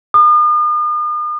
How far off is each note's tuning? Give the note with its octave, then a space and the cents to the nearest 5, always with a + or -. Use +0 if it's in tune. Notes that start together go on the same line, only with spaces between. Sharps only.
D#6 -40